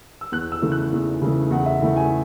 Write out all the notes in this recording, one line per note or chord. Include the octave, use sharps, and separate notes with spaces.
E6
E2 F#6
E6
C#3 E3 A3
F#6
E2
C#3 E3 A3
E2 F#5
E5
C#3 E3 A3
G#5